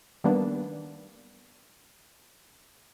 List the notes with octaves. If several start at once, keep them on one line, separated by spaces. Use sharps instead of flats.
D#3 G3 A#3 B3 D4